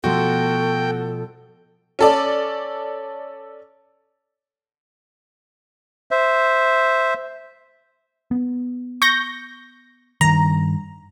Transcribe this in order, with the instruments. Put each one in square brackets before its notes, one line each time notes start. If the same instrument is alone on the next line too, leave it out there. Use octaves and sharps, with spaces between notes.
[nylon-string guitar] B2 F3 A3 [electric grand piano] F#4 [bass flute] A4 [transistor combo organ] G5
[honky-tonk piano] C#4 A4 D5
[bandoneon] C5 E5
[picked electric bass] B3
[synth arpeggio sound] C#6 G6 A#6
[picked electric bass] G2 D#3 [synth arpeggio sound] A#5